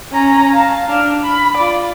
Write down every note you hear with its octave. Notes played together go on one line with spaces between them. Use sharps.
C#4 A#5
F5 A5
D4 F6
B5
F4 D5